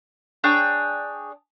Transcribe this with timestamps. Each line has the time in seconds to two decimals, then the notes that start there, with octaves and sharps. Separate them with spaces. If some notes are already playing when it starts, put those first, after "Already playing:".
0.44 D4 G#4 C#5 G5